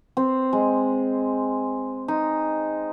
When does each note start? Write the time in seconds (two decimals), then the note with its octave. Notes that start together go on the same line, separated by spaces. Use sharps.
0.17 C4
0.53 G#3
2.08 D#4